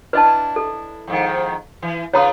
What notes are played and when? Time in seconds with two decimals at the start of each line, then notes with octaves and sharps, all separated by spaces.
0.13 D4 E4 B4 D#5 A5
0.56 A4
1.08 F2 G#2 D#3
1.82 E3
2.13 C#3 F4 B4 C#5 A#5 D#6